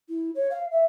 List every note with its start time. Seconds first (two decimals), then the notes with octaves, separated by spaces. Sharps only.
0.08 E4
0.34 C#5
0.50 F5
0.71 E5